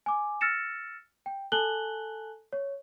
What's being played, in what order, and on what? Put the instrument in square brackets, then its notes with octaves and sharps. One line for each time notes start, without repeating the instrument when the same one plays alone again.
[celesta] G#5 D6
E6 F6 A6 A#6 C#7 E7
G5
A4 G#5 A5 F#6 F#7 G7
C#5